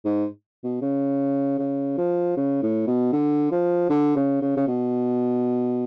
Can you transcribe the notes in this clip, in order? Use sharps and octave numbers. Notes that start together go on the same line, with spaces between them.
G#2
B2
C#3
C#3
F3
C#3
A2
B2
D3
F3
D3
C#3
C#3
C#3
B2